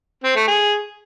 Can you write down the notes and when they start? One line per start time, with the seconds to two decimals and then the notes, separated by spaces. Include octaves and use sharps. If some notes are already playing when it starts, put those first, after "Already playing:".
0.24 C4
0.36 A3
0.48 G#4